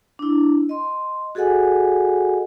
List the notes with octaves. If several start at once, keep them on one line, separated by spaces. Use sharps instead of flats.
D4 E4
D#5 C6
F#4 G#4 A4 D#5 F#5 G#5